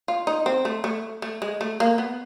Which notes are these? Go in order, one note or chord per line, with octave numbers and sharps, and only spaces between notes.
F4
D#4
C4
A3
A3
A3
G#3
A3
A#3
B3